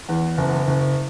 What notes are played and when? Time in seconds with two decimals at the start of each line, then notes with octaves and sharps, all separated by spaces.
0.09 E2
0.38 F#1
0.67 F#1